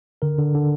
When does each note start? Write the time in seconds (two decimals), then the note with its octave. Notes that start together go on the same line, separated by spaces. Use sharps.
0.22 D3 A#4
0.38 D3
0.54 D3